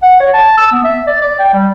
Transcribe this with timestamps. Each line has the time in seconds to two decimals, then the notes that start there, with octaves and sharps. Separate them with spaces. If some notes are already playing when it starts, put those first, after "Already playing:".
0.03 F#5
0.20 C#5
0.34 A5
0.58 E6
0.72 B3
0.84 E5
1.07 D5
1.21 D5
1.39 G5
1.54 G3